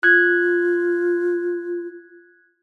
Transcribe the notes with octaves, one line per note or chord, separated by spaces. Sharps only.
F4 F#6 G#6